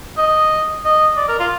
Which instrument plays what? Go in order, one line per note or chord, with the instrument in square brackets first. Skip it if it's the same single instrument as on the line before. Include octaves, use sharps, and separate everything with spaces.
[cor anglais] D#5
D#5
D5
A#4
F4